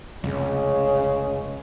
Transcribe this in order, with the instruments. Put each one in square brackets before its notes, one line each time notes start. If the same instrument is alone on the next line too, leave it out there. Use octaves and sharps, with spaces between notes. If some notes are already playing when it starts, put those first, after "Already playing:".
[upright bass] F1 [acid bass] C#2 [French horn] C#3